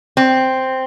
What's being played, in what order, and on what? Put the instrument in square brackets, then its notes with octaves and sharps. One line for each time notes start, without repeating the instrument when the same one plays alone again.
[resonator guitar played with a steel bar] C4